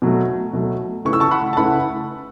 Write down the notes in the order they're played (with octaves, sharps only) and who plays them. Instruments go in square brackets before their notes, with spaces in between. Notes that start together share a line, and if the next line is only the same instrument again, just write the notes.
[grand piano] B2 F#3 A3
B2 F#3 A3
[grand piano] C#3 A3 E4 B4 [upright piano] C#6
[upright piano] E6
A5 C#6
F#5 B5
A5
[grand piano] C#3 A3 E4 B4 [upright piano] F#5 B5